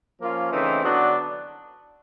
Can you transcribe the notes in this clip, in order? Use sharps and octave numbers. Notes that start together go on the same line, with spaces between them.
F3 A#3 C#4 F4
C#3 E3 A3 C4 D#4
D3 F#3 B3 D4